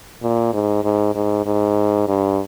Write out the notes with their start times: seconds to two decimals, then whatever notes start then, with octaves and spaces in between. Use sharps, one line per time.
0.23 A#2
0.53 G#2
0.84 G#2
1.15 G#2
1.46 G#2
2.08 G2